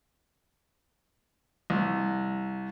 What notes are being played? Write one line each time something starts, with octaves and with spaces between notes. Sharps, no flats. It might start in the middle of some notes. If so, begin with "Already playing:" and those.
C2